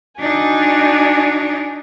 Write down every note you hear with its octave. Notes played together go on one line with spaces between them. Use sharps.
D4 D#4 F#4 G#5